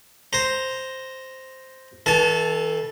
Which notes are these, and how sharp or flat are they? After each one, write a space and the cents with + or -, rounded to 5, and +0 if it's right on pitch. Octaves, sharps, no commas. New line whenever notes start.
C5 +0 A#5 +0
E3 -35 A4 +0 A5 -40